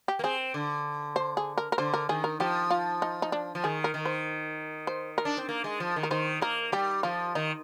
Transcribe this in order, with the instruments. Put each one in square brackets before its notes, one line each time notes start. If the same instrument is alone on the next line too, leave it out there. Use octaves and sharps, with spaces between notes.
[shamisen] G4
[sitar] A#3
[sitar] C4 [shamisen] G#4
[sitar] D3
[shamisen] C5
G#4
A#4
A#4
[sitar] D3 [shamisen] C5
[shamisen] A#4
[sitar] D#3 [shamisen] G#4
[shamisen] A#4
[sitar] F3 [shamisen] G4
[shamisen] F4
D#4
D#4
D4
[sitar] F3
[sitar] D#3 [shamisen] G#4
[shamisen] A#4
[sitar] D#3
[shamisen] C5
C5
A#4
[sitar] D4
C4
A#3
G#3
F3
D#3
[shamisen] A#4
[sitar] D#3 [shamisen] C5
[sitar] A#3 [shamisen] A#4
[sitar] G3 [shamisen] G4
[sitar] F3 [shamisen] F4
[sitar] D#3 [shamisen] D#4